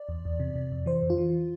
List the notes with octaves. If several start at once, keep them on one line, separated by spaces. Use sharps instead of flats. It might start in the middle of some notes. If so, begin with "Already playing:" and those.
Already playing: D5
E2
E2
C3
C3
F2
E3 C5
F2
F4
E3